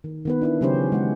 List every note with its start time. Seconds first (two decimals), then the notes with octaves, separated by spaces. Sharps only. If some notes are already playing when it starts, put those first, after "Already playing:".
0.04 D#3
0.25 D#3 B3 B4
0.41 D4 E4 B4
0.61 C#3 F#3 C#4 G4 C5
0.74 E3
0.92 G#3 F#5